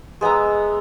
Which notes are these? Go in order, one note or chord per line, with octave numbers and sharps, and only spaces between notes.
G#3 B3 E5 A#5